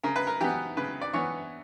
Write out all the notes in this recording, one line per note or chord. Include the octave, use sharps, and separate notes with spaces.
C#3 A#4
B4
A#4
E3 B3 G4
C#3 B4
D5
E3 B3 C#5